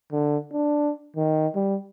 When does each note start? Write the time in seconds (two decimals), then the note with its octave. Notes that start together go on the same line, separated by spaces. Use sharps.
0.12 D3
0.53 D4
1.16 D#3
1.55 G3